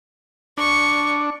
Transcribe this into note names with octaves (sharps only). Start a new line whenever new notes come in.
D4 C#6